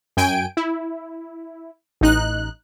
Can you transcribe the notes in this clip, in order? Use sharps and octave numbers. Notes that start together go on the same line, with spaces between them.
F#2 G5 G#5 D7
E4
A1 D#4 F#6